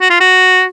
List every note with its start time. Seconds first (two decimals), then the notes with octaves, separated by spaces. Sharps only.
0.01 F#4
0.10 F4
0.20 F#4